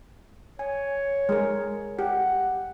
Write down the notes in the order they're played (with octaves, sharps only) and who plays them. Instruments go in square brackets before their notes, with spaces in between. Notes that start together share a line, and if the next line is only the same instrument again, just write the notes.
[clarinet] C#5 [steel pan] G#5
[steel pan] G#3 G#4 A#4
[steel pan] G4 [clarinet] F#5